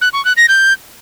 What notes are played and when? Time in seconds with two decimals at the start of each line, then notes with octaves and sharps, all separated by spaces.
0.01 F#6
0.13 C#6
0.25 F#6
0.37 A#6
0.49 G6